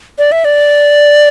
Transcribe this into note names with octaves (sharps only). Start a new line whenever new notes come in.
D5
E5
D5